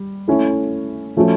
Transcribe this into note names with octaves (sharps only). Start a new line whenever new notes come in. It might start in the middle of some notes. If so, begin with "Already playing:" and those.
Already playing: G3
A3 C#4 E4 A4
F3 A3 C#4 F#4 A4